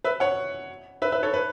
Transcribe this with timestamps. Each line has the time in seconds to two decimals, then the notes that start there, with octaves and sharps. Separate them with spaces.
0.04 B4 E5
0.20 C#5 F#5
1.02 B4 E5
1.12 B4 E5
1.23 A4 C#5
1.34 B4